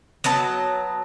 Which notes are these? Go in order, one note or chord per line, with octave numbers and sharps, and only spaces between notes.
F#3 B3 D#5 A5